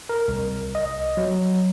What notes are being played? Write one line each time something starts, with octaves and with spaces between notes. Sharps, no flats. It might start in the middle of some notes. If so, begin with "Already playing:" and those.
A#4
C2
D#5
F#3